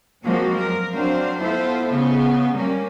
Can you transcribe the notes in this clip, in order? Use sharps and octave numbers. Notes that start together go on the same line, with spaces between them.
F3 F#3 G#3 A#3 C4 F#4
A#4
F#3 C4 D4 C5 F5
B3 E4 F4 A4 C5
C#3 B3
G3 A#3 C#4